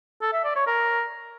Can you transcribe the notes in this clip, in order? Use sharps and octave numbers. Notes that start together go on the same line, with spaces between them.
A4
E5
D5
C#5
A#4